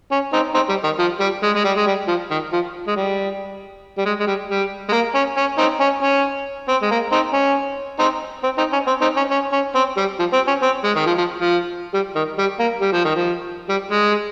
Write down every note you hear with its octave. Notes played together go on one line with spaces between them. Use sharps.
C#4
C4 D#4
C4 D#4
G3
D#3
F3
G3
G#3
G#3
G3
G#3
G3
F3
D#3
F3
G#3
G3
G3
G#3
G#3
G3
G3
G#3
A#3
C#4
C#4
C4 D#4
C#4
C#4
C4
G#3
A#3
C4 D#4
C#4
C4 D#4
C4
C4 D#4
C#4
C4
C4 D#4
C#4
C#4
C#4
C4
G3
F3
C4
C#4
C4
G#3
D#3
F3
F3
F3
G3
D#3
G3
A#3
G3
F3
D#3
F3
G3
G#3